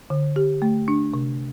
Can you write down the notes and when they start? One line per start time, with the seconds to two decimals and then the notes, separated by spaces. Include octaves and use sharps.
0.10 D3
0.36 G4
0.62 A3
0.88 D4
1.13 C3